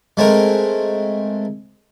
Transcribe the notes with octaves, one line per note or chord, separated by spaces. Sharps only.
G#3 A3 C4 A#4